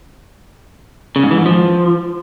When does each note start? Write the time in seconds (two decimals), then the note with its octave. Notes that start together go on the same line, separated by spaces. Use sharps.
1.16 C#3
1.23 G#2
1.31 E3
1.38 G#2
1.46 F3